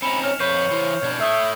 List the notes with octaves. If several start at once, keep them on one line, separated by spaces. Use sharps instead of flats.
C4 C#4 D#4 B5 C#7 E7 F7
C#5 F6
F2 B4 C#5 C#6 G6 C7
E3 E4 C5
B2 D4 G#6
A3 C#5 E5 D#6 E6 C7